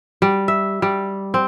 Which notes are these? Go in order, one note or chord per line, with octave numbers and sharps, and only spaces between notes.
G3
E5
G3
C4